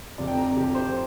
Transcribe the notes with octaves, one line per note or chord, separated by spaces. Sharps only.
F1 F2 C3 D5
G5
A#5
G5
F1 F2 C3 G4
C5